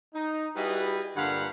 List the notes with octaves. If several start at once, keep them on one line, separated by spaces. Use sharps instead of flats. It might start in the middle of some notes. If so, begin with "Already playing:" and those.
D#4
G3 E4 F#4 G#4 B4 D#5
G2 A#2 D3 F5 F#5 B5